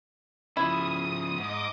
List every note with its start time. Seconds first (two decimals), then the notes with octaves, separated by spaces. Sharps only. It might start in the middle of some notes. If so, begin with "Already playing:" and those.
0.57 C#3 F3 E4 D#6
1.38 G#2 D#5 D6 D#6